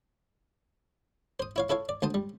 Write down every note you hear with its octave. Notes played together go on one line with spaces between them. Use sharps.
C5 D#6
E4 C#5 F5
E4 A4 C#5 F5
D5
D2 C5 A5 D#6
G3